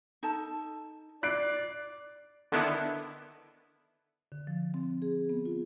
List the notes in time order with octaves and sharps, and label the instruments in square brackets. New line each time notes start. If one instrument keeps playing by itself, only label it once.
[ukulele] D#4 A4 A5
[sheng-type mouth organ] D5 [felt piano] F#6 C7 D7
[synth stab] D3 D#3 B3 D4 E4
[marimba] D3
F3
C4
G#4
B3
F4